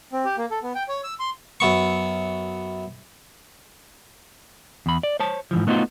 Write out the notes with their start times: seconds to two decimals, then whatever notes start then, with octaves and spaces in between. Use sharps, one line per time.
0.12 C4
0.25 G4
0.38 A#3
0.51 A4
0.63 B3
0.75 G5
0.89 C#5
1.04 E6
1.20 C6
1.60 F#2 B3 C#6
4.86 E2 B5
5.03 D5
5.20 C5 C#5 A5
5.51 G#2 E3 F3
5.67 A3 B3 D#4 F4 F#4 C5